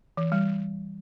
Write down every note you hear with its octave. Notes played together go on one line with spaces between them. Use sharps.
E3
G3